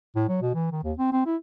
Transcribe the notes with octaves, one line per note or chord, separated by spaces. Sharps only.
A2
F#3
B2
E3
D#3
D#2
C4
C4
E4